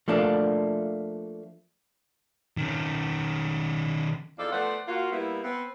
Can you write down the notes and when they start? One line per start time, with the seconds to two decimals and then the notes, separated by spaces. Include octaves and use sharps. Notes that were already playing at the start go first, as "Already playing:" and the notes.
0.08 F3 A3 A#3 D4
2.57 D#3 C#4
4.39 E2 F3 D#4 A4 D5
4.52 F3 A3 B3 C5 D5 F#5
4.88 A#3 F4 F#4
5.12 G3 A#3 B3 E4
5.44 B3 C4